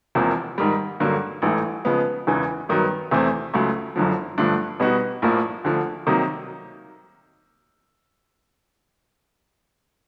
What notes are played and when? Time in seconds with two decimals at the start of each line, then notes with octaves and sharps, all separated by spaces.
0.15 E1 E2 C3 F3 A#3
0.58 G#2 D#3 G3
1.00 G2 D3 F#3 A#3
1.42 A1 G#2 E3 A3
1.85 C#3 F3 G#3 B3
2.27 E1 E2 C#3 E3
2.69 G2 D#3 F#3 B3
3.11 E2 C3 E3 A3 C4
3.54 C#2 C#3 F#3 A3
3.96 F#1 F#2 D3 F3
4.38 G2 D3 F3 A3 D4
4.80 B2 G3 B3 D#4 F#4
5.22 A#1 A2 F3 A#3
5.64 D2 D3 F3
6.07 C3 D#3 F#3 A#3 D#4